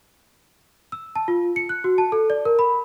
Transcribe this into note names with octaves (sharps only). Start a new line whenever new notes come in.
E6
A5
F4
C#7
F#6
F#4
A5
A4
D5
A#4
B5